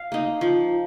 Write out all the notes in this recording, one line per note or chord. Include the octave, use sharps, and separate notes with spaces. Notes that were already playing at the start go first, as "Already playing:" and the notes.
Already playing: F5
A#3 D#4
F3